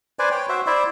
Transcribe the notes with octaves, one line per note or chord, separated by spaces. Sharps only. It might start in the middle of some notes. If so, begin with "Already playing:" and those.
B4 C5 D5 G#5
C#5 G5
F#4 C5 E5
E4 C5 D5 E5